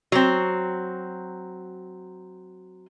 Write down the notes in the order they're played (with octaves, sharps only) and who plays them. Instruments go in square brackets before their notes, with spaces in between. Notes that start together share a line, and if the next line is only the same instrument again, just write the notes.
[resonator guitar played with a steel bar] F#3 C4